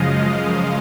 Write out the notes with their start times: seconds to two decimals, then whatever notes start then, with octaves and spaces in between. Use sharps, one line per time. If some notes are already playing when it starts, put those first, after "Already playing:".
Already playing: F#2 C#3 F3 G#3 D#5 F5
0.35 D#5